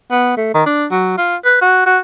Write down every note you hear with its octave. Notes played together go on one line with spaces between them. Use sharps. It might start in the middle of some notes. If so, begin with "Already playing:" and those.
B3
A3
D#3
D4
F#3
F4
B4
F#4
F#4